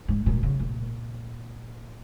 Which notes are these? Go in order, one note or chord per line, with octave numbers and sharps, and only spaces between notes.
G#2
A#2
C#3
A#2